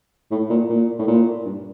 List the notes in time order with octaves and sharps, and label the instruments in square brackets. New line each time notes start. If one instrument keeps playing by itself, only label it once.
[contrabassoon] A2
A#2
A#2
A2
A#2
G2